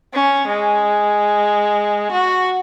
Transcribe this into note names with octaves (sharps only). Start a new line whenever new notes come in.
C#4
G#3
F#4